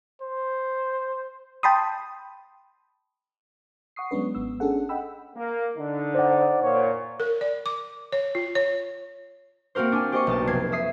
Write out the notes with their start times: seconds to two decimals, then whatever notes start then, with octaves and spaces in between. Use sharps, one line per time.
0.22 C5
1.63 G5 A5 B5 C6 D#6
3.96 F#5 C#6 D#6 C7
4.11 F#3 G#3 B3 C#4 D4 B4
4.35 G#1 B3 E6
4.60 C#4 D4 G#4 A4 F#5
4.89 D#5 F#5 G5 B5 E6
5.35 A#3
5.76 D3 D#4
6.15 C5 D5 F#5
6.62 A#2 C#5
7.20 A#4
7.41 D5
7.66 D6
8.12 C#5
8.35 F4
8.55 C#5
9.75 A#3 C4 F#4 A#4 C5
9.92 D4 G#5
10.12 G4 C5 D#5 C#6
10.27 B1 D#5 A5
10.47 F1 G#6 C7
10.72 E5 D#6 C7